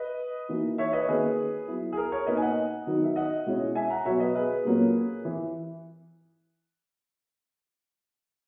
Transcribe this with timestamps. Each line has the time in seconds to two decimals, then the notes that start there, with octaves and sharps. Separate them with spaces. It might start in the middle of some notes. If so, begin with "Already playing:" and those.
Already playing: B4 D#5
0.49 E3 A#3 D#4 F#4
0.78 C#5 E5
0.93 B4 D#5
1.01 C#5
1.08 D#3 A#3 C#4 F#4 G#4 B4
1.68 F#3 B3 E4
1.93 G#4
1.97 A#4
2.12 A#4 C#5
2.27 B2 A#3 D#4 F#4 B4 D#5
2.37 G#5
2.42 D#5 F#5
2.87 D#3 F#3 B3 D#4 F#4
3.04 E5
3.16 D#5 F#5
3.46 B2 G#3 C#4 E4
3.75 E5 G#5
3.90 F#5 A#5
4.05 B2 F#3 B3 C#5 E5
4.20 B4 D#5
4.36 G#4 B4
4.65 A#2 F#3 A#3 C#4 F#4
5.25 E3